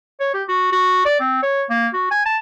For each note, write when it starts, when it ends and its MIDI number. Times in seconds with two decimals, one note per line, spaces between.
0.20 0.31 73
0.34 0.43 67
0.48 0.69 66
0.72 1.03 66
1.05 1.16 74
1.20 1.42 60
1.43 1.64 73
1.70 1.88 58
1.94 2.11 66
2.11 2.25 80
2.26 2.38 81